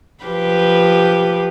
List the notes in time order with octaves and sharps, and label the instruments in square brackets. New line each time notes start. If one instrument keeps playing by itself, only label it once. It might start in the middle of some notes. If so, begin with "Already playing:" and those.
[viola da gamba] F3 G4 B4